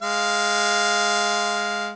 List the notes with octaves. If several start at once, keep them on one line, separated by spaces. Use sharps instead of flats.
G#3 F5